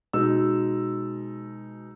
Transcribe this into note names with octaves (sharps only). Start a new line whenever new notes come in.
B2 G#3 D#4 E6